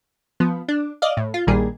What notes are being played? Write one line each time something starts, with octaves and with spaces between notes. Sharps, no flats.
F3 B3
D4
D5 D#5 F5
A2
F4
A#1 A#2 D#3 G3 A#3 G#4